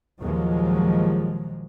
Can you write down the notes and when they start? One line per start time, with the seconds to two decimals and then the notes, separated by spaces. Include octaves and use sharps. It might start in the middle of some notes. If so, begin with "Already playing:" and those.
0.20 D#2 A#2 F3 F#3 G#3